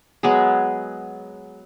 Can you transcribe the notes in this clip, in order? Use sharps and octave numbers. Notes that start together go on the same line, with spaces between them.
F#3 G#3 B3 G#4